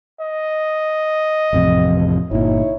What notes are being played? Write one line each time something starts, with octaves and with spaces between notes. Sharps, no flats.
D#5
A1 F2 C3
G1 A#2 D#4 E4 C#5